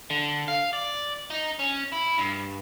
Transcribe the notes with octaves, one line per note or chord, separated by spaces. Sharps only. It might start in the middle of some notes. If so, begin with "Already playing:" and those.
D3
F5
D5
D#4
C#4
E4
G2